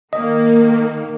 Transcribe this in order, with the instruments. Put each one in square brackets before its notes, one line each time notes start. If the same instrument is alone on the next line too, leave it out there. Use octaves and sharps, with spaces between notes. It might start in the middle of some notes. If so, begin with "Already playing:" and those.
[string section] D#3 A#3 [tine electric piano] D#5